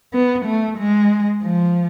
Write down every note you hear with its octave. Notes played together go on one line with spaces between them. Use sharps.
B3
A3
G#3
F3